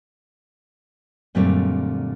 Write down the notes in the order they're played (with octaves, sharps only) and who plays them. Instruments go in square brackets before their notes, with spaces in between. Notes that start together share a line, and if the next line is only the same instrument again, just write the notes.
[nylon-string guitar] F#2 A#2 D3 G3 A3 C4